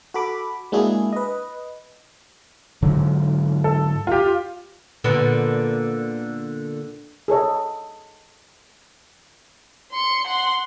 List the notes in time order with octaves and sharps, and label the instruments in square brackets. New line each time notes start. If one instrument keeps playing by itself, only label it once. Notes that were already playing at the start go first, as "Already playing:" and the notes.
[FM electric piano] F#4 A4 B5 D6
G#3 A#3 D4 E4 F#4 G#4
B4 D#5
[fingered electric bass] G#2 D3 F#3
[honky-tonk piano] A4
F4 G4
[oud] A#2 D3 B3
[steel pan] G#4 A4 C#5 D#5
[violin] C6 C#7
F#5 C6